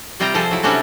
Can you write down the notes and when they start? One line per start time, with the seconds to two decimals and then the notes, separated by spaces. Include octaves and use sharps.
0.20 C3 G3 C4 F4 G4 A#5
0.34 F3 C4 G#4 A4 C5
0.51 F#3 E4
0.63 C3 G3 C#4 D4 F#4 A4